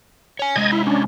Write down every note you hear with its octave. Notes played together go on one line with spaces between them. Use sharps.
C#5 G#5
C3 G#3 D#5 G#6
E4
C#4 D4